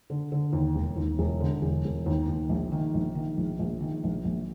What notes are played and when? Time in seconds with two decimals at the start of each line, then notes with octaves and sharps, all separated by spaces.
0.10 D3
0.32 D3
0.53 D#2
0.75 E1
0.96 D#2
1.19 E1
1.40 D3
1.62 E1
1.85 E1
2.06 D#2
2.27 D#2
2.49 A#1
2.72 D#3
2.94 A#1
3.15 D#3
3.37 A#1
3.59 A#1
3.80 D#3
4.04 A#1
4.25 A#1